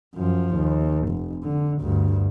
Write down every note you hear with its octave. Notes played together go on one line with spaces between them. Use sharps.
F#2 F3
D#2
F1
D3
D2 G2